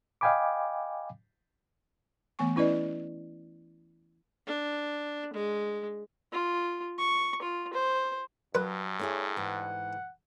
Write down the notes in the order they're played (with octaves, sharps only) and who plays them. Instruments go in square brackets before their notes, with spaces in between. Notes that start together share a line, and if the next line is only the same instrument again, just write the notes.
[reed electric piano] D#5 F5 G5 G#5 B5 D6
[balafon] E3 A3 B3 G#5 C#6
C#4 E4 B4 D5 D#5
[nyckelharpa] D4
G#3
F4
C#6
F4
C5
[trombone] G2 [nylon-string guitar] F#3 [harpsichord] B4
[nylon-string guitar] A3 E4 G#4 [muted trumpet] C#5
[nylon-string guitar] G#2 E3 [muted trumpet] F#5